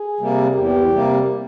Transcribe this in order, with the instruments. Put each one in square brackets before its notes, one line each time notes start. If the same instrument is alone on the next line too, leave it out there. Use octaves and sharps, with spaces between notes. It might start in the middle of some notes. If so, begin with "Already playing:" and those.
Already playing: [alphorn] G#4
[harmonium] C3 G3 A#3
[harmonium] E2 [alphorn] G4
[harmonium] C3 G3 A#3